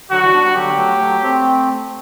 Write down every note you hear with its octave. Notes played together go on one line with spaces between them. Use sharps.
D3 F#3 F#4
E3 G3
B3 D4
G3 B3
D3 F#3 G4
B3
F#3 A3
F#3 A3
A3 C4